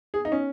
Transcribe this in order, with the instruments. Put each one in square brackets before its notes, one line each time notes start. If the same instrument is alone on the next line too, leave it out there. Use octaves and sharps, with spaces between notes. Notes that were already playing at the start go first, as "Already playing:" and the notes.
[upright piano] G#4
D#4
C#4